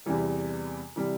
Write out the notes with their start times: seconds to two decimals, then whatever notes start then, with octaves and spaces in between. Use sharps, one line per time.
0.06 E2 C3 E3 G3
0.96 C3 E3 G3